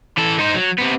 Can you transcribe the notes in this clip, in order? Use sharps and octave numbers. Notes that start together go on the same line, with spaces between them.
E3 A4
D#4 C5
F#3
C3 B3